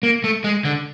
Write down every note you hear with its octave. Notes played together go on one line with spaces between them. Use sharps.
A#3
A3
G#3
D3